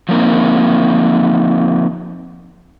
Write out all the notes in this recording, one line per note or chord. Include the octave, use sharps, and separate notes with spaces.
F3 F#3 A#3 C4 D#4